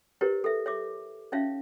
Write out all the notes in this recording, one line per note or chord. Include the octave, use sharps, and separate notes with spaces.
E4 G4 A#4 B4 C#5
A4 E5
C#5 E5 D6
C#4 D#4 C#5 E5 F5